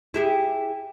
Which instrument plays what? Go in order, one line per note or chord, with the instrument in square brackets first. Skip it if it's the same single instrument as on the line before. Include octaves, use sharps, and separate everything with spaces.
[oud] E4 G4 G#4